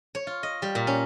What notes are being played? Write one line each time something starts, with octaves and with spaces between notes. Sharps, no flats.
C#5
F4
D#5
G3
A#2
C#4